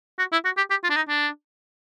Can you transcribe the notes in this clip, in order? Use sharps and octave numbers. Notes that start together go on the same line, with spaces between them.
F#4
E4
F#4
G4
G4
F4
D4
D#4
D4